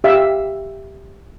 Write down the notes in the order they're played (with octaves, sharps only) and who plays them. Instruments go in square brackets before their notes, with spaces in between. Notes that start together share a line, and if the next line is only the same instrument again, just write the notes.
[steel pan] G4 E5 F5